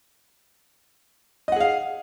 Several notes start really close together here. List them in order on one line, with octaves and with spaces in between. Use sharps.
D#5 F#5 G#4 F5